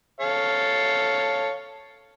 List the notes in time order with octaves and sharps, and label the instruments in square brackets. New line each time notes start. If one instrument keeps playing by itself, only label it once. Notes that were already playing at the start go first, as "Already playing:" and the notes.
[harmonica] A4 C#5 F5